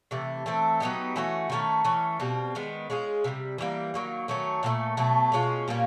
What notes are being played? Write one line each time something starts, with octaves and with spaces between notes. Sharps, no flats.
C3 E3 A3
E3 A3 C4
F#3 B3 D#4 G4
E3 A3 C#4 F#4
D#3 F#3 A3 C#4
E3 A3 C#4
B2 G3 C4 F4
D#3 G#3 B3
G#3 C#4 F4 G#4
C3 E3 G3
E3 G3 A#3
D#3 F#3 A#3
D#3 F#3 A3 C#4
A#2 F3 A3 C#4
B2 F#3 A3
B2 G#3 C#4 F4
A#2 G3 A#3 C#4